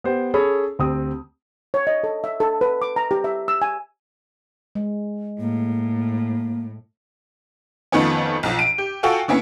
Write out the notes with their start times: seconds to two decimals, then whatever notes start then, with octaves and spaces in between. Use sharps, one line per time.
0.04 B3 G4 C5
0.34 C#4 G#4 A4 C#5 B5
0.79 D2 C4 G4 D#6
1.74 C#5
1.87 D#5
2.04 A4
2.24 E5
2.40 A4
2.61 B4
2.82 D6
2.96 A#5
3.11 G4
3.24 E5
3.48 E6
3.62 G#5
4.75 G#3
5.40 A2 A#3
7.92 F2 D#3 F3 A3 B3 C#4
8.43 B1 F3
8.59 D7 D#7
8.78 G4
9.03 F4 F#4 A4 F5 G5 G#5
9.28 D3 A#3 B3 C#4 E4